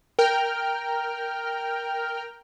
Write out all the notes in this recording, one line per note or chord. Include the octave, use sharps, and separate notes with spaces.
A#4 G5 F6